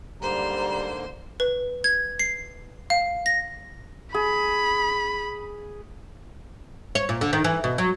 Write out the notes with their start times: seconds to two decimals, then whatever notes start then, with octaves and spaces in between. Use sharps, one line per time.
0.22 G#2 D3 G3 A#3 C5 A#5
1.40 B4
1.84 G#6
2.19 C7
2.90 F5
3.26 A#6
4.14 G#4 B5
6.95 C#5
7.09 A#2
7.21 D3
7.33 D#3
7.44 E3
7.64 B2
7.78 F#3